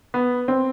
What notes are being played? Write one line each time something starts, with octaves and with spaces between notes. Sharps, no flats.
B3
C4